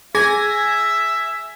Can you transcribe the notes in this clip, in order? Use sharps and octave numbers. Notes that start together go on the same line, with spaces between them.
G#4 E5 G#5 G#6 A#6